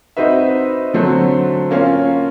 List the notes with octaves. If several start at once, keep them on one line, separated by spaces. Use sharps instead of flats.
C4 D#4 F#4 B4 E5
D3 F#3 A3 C4
A#3 C#4 F4